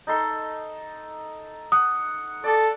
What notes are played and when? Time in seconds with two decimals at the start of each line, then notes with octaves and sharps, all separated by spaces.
0.07 D#4 A4 C6
1.72 F#5 D#6
2.44 A4 D5 D6